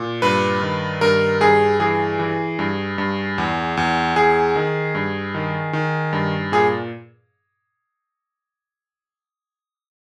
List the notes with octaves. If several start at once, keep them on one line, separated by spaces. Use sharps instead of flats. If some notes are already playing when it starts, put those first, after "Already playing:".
Already playing: A#2
G2 B4
D#3
G2 A#4
G2 G#4
E3 G#4
E3
G2
G2
E2
E2
E2 G#4
D#3
G2
D#3
D#3
G2
A#2 G#4